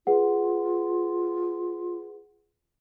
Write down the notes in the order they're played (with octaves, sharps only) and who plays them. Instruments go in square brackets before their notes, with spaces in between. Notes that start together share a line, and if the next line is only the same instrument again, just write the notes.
[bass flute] F4 [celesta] G#4 B4 F#5